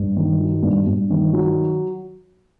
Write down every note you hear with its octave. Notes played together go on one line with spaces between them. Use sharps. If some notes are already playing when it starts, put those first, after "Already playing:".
Already playing: G2
D#3
F#3
G2
G2
D#3
F#3